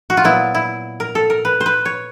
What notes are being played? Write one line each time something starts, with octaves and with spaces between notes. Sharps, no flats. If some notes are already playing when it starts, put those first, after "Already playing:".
F#4
F4
A#2 F#3 B3 E4
E4
A#4
A4
A#4
B4
C5
B4
C#5